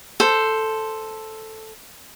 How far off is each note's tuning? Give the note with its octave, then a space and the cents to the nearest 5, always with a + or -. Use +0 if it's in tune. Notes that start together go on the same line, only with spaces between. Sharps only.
A4 +0 C5 +0